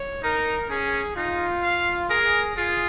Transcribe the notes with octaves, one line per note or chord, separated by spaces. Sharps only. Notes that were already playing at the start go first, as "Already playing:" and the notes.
Already playing: C#5
D#4 A#4
C#4 G#4
D#4 F4
F5
G#4 A#4
F4 G#4